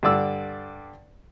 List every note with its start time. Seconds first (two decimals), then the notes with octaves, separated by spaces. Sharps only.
0.03 G2 D3 D5 E6